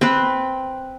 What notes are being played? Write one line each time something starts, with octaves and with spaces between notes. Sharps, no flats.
C4 B4